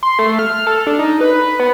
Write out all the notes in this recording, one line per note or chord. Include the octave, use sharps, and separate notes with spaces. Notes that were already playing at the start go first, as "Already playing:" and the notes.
C6
A3
F6
A4
D4
D#4
B4
B3